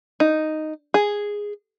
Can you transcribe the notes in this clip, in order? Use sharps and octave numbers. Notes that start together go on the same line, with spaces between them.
D#4
G#4